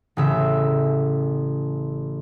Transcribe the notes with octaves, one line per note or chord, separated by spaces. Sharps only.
A1 C#3 E5